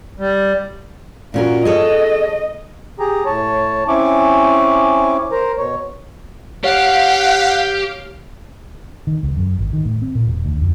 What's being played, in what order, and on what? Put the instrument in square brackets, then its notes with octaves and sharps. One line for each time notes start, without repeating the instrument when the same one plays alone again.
[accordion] G3
[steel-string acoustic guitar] A#2 C#4 A#4 [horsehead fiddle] F4 F#4
[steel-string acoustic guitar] G#4 A4 C#5 [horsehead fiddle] D#5
[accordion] G4 G#4 A#5
A2 C#5 A5
C4 C#4 E4 G#5 C#6 D6
A#4 C5 A#5
B2 C#5
[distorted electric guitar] G4 [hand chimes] C#5 [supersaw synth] F5 [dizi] F#5
[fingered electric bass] D#3
C#2
F#2
G#1
D#3
A2
C4
A#2
E1
D2
F2